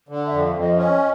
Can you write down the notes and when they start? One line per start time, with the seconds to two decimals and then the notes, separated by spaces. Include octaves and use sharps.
0.09 D3
0.26 E5
0.31 F2
0.43 F5
0.55 F2
0.61 D#5
0.77 C#4 D#5